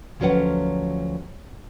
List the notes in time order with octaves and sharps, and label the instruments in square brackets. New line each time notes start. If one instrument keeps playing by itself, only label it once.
[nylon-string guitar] D2 F3 F#3 C#4 B4 F#5